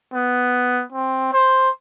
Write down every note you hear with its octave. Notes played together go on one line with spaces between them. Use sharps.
B3
C4
C5